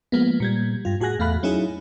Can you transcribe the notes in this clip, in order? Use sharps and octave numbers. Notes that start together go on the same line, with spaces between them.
F3 G#3 A#3 B3
A#2 G3 G#6
G2 F4
A2 F#4 G#4 G#5 F#6 A#6
E2 A3 F5 B5 F#6
F#3 C#4 D#4 E4 G#4